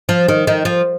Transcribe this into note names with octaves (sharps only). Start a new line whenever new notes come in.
F3
D#3
D#3
F3